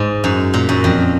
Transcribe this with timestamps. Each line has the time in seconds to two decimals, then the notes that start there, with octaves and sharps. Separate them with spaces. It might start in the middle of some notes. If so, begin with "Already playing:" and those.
Already playing: G#2
0.24 F#2
0.54 A#2
0.69 F#2
0.84 F2